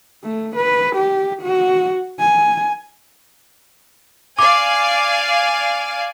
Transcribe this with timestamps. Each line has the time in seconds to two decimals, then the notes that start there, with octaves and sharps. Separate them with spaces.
0.24 A3
0.56 B4
0.96 G4
1.42 F#4
2.19 G#5
4.39 D5 F5 G#5 D6